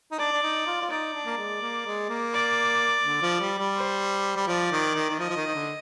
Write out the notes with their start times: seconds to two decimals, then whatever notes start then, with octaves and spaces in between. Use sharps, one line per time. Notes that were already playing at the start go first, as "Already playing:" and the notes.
0.12 D#4
0.19 D4 D5
0.32 D4
0.43 D#4
0.67 F4
0.82 F4
0.90 D#4 D5
1.14 D4
1.26 A#3
1.38 G#3
1.61 A#3
1.86 G#3
2.09 A#3
2.33 D5
3.05 D3
3.22 F3
3.40 G3
3.59 G3
3.76 C5
4.36 G3
4.47 F3 D5
4.72 D#3
4.95 D#3
5.10 D#3
5.19 F3 D#5
5.30 F3
5.36 D#3
5.46 D#3
5.55 D3